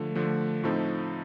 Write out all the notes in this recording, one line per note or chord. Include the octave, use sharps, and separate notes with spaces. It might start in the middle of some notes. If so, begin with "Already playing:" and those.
Already playing: D3 F3 A3
D3 F3 A3
A2 F3 C4 D#4 A4